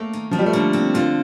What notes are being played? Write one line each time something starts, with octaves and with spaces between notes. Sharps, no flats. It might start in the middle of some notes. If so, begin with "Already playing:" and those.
Already playing: A3 A#3
D#3
D#2 F3
G3
A3
D3 A#3
C4
D3 F4